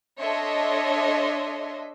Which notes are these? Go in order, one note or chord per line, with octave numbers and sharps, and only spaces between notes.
D4 A4 C#5 D#5 E5 C6